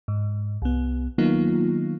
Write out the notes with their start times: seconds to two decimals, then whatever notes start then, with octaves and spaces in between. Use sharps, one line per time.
0.08 G#2
0.62 C2 B3
1.18 D#3 F#3 A#3 B3 D#4 F4